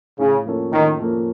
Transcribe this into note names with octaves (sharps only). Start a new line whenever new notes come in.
A2 C#3
F3 A#3 C#4 A4
A2 D#3
F3 A#3 C#4 A4